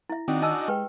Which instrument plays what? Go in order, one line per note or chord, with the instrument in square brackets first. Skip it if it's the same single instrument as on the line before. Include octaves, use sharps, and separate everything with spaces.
[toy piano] E4 E5
[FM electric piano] D#3 [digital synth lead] C4 [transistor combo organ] D4 D#4 F#4
[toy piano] D#5 A5 E6 [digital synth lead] G#5
[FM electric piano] G#3 [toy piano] G4 B4 G5